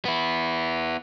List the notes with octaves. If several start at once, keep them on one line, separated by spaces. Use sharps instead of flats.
B3 E4